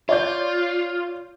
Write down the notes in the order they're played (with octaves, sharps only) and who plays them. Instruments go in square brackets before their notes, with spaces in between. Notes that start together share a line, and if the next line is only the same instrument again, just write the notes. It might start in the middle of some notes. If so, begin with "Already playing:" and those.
[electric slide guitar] F4 [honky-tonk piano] C#5 D5 G6